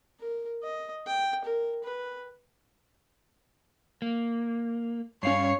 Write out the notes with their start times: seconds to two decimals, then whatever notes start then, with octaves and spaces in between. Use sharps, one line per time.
0.20 A#4
0.63 D#5
1.07 G5
1.45 A#4
1.84 B4
4.02 A#3
5.23 G2 C#4 C#5 F5 C7